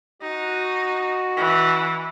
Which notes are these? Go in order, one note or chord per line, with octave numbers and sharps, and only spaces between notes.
D#4 F#4
E3